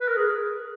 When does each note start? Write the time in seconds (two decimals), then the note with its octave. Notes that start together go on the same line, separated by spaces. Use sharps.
0.01 B4
0.08 A#4
0.16 G#4